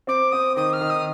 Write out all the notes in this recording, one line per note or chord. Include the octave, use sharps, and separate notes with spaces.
C4 D6
C4 D#6
D#3 D#6
F6
D#3
D#6